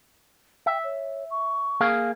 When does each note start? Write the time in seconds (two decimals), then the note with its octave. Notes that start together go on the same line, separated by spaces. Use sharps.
0.66 E5 G5
0.84 C#5
1.31 C#6
1.80 A#3 G#4 F5